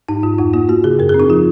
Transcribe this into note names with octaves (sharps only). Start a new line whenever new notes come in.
G#2 D#4
G#2 F4
F2 D#4
A#3 F4
A#3 F#4
C#3 G#4
F#2 A#4
G#4
C4
D#4
F3 F4